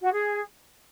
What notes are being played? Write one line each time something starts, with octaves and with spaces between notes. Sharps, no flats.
F#4
G#4